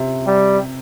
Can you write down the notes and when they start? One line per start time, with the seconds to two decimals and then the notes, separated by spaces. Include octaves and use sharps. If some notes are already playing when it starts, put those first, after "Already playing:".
Already playing: C3
0.27 G3